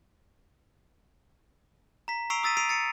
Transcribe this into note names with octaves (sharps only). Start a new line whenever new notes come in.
A#5 B6
A#5 C#6 E6 C7 D7 F7
D#6 E6 A6 B6 D#7
A#5 E6 C7 D7 D#7 F7
A6 C#7 D#7